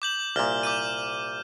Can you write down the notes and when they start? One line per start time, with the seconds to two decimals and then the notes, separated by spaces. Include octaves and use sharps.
0.02 D6 G6 F#7
0.36 C2 A#2 F6
0.63 D6 G6 D#7